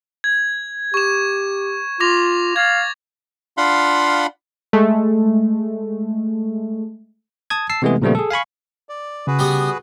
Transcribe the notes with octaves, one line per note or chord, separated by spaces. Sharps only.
G#6
G4 C#6 E7
F4 D6 A#6 F7
F5 G#6 A6
D4 F4 F5 F#5 B5 C6
G#3 A3
A5 D#6 G#6
A5 E6 C7
C3 E3 G#3 A3 B3 G#4
A#2 C#3 F3 G3 A3 B3
G#4 A4
F5 G#5 B5 C#6
D5
C#3 F#4 G#4 B4
G3 B3